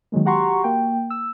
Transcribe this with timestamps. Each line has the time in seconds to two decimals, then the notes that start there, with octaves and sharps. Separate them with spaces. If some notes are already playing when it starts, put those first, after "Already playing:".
0.12 D#3 F#3 G#3 A#3
0.25 F#4 G4 F#5 A#5 C6 C#6
0.64 A#3 G5
1.10 E6